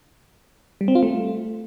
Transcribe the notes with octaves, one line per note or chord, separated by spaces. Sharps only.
G3
C4
F4
A3